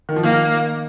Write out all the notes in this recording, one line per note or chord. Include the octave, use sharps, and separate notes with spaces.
D#3
F3
D#3 A#3